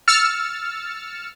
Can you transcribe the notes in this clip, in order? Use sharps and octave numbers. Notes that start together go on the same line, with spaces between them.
E6 F6 A6 C#7